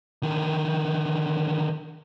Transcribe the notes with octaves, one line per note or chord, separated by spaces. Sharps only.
D3 D#3